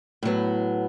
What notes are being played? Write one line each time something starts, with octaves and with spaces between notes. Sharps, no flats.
A2 F#3 B3